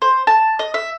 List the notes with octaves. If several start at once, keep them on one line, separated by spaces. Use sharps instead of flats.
C5
A5
D#5
E5